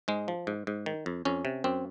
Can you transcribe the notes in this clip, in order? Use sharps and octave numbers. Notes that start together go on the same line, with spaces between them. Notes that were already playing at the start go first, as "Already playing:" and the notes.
G#2 G#3
F3
G#2
G#2
D#3
F2
F2 C#4
C3
F#2 C4